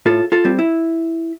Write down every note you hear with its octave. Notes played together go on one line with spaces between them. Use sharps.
A2 F4 A4
F4 A4
G3 C4
E4